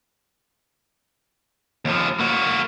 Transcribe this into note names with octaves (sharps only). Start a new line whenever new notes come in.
D#2 F3
A#3 F#4